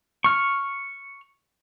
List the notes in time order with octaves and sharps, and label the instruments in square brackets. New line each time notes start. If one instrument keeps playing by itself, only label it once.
[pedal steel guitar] C#6 F6